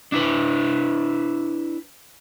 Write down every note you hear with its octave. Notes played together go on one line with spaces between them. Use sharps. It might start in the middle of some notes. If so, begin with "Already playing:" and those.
D4 E4 B4